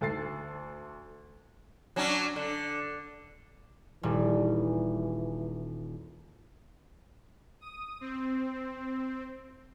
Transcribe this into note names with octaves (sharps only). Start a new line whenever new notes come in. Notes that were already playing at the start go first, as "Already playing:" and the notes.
D2 A4 A6 C7
F#3 C#4 D4
D3
D#1 E3 G3
D#6
C4